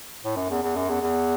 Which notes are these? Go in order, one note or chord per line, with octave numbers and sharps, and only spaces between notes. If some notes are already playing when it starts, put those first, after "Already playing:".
A2
F#2
E2
E2
F#2
E2
E2